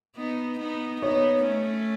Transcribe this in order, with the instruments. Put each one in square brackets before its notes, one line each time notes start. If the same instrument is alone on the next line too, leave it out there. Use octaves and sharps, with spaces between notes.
[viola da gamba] B3 D#4
B3 D#4
[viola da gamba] B3 D#4 [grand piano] C#5
[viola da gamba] A3 C#4